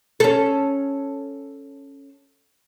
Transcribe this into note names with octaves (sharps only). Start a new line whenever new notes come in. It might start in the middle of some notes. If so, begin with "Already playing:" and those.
C#4 A4